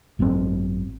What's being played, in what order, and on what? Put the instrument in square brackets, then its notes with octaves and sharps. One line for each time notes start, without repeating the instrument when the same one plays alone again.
[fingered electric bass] G#1 F#2 B2 C4